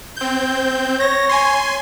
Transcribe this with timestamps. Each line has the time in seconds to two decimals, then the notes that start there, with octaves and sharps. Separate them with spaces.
0.16 C4 G6
1.00 C#5 A#6
1.29 G#5 C6